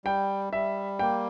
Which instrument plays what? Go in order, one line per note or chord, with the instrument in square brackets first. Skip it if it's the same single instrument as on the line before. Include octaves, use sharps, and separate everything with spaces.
[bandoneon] G3 [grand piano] G5
[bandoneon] G3 [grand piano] E5
[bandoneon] A#3 [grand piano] G5